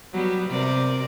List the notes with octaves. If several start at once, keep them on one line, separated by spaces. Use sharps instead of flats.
F#3 G3 B3
C3 A#4 D5